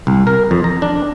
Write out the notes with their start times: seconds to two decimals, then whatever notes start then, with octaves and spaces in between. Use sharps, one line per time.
0.07 C2
0.27 A#4
0.51 F2
0.64 A#5
0.82 D4